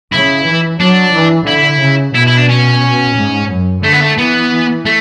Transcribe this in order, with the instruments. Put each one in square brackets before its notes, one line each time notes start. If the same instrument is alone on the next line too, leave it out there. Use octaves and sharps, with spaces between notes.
[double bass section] C#3 [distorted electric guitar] E4
[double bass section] E3
[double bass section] F#3 [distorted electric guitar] D4
[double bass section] E3
[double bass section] D3 [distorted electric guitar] E4
[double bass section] C#3
[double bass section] B2 [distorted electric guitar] E4
[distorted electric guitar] E4
D4
C#4
[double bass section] G#2
F#2
[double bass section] D3 [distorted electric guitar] A3
[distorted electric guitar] B3
A3
[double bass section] E3 [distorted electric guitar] B3
[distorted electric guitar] A3